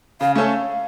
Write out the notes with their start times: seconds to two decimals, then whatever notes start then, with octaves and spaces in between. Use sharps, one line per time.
0.21 C#3 F5
0.35 A3 C#4 A4 F5